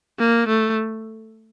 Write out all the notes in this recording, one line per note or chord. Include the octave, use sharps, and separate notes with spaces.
A#3
A3